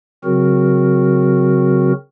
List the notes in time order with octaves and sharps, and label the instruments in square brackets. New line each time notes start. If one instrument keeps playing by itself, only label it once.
[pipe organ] C#3 F#3 C4 F#4 A#4